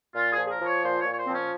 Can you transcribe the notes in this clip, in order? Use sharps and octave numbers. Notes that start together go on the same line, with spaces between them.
A#2 F4
G#4
F3
G#4
A#4
F3
C#5
A#2 C5
C#5
A#2
C#5
C5
F3 C4
C#4